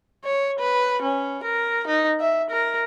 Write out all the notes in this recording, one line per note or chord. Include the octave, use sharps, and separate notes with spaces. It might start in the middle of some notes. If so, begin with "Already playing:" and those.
C#5
B4
C#4
A#4
D#4
E5
A#4